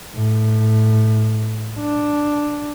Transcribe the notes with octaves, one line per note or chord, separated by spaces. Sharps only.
A2
D4